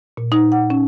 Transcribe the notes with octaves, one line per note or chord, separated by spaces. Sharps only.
A#2
D#4
F#5
C#4